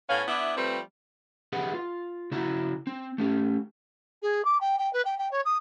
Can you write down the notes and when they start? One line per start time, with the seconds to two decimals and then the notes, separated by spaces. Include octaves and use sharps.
0.09 A2 B3 C#4 F5
0.28 B3 D4 E4
0.57 F3 G3 A3 C4 B4
1.53 G4 G#4 B4 D#5 F#5
1.74 F4
2.31 C#3 E4 F#4 A#5
2.87 C4
3.18 A3 C#4 G4
4.22 G#4
4.45 D6
4.61 G5
4.78 G5
4.93 B4
5.05 G5
5.18 G5
5.31 C#5
5.45 D#6